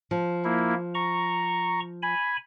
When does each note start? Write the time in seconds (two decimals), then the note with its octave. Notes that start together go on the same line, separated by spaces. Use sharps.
0.11 F3
0.44 A#3 E4
0.95 A#5 C#6
2.02 G#5 B5